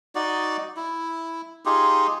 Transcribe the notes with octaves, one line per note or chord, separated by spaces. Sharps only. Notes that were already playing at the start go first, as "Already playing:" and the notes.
D#4 F#4 D5
E4
D#4 F4 G4 G#4